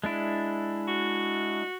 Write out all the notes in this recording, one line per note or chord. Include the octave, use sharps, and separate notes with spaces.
G#3 D4 E4
F#4